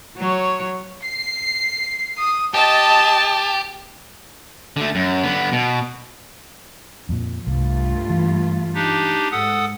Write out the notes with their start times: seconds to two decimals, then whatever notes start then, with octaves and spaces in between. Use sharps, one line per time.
0.17 F#3 C#5
1.03 C7
2.18 D#6
2.54 G4 D#5 A5
4.77 D3 A3
4.95 F#2
5.23 D3 B3
5.53 B2
7.09 F2 A#2
7.47 C2 G2 A3 F4
8.10 E3
8.75 D4 D#4 G4
9.32 G#2 A4 F#5 D#6